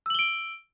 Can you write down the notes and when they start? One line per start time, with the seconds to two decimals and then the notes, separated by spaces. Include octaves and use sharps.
0.06 E6
0.10 F#7
0.15 G7
0.19 D7